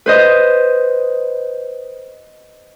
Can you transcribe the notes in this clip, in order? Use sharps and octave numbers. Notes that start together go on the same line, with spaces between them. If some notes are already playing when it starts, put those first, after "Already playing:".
B4 C5 D#5